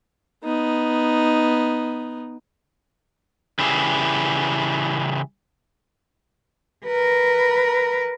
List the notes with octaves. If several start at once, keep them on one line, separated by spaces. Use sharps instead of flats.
B3 D#4
C#3 E3 G3 E4 G#4
A#4 B4